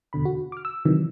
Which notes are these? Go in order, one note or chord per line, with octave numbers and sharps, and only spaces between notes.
E2 B2 D3 B5
F#4
D6 F6
E6
C3 D#3 E3 F#3